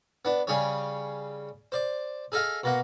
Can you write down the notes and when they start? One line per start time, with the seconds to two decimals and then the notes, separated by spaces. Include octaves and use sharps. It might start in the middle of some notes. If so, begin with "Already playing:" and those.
0.25 B3 D4
0.47 C#3 G3 G#4 C#5
1.72 C5 D5
2.32 G#4 A4 D#5 F5
2.63 B2 A#3 F#5